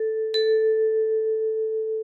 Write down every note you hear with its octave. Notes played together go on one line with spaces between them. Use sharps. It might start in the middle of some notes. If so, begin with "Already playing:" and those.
Already playing: A4
A4